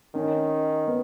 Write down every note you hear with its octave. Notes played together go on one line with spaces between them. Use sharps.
D#3 C#4
B3